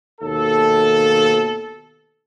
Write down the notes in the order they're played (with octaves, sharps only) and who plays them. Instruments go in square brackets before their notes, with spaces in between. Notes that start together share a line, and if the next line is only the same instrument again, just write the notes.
[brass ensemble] D#2 B2 A4